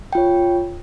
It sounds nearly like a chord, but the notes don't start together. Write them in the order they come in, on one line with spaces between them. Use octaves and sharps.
G5 F4 C#5